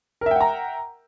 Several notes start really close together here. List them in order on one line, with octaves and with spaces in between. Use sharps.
A#4 E5 G5 F#5 A#5